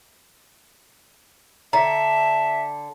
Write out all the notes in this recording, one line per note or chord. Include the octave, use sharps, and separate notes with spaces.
D3 E5 A#5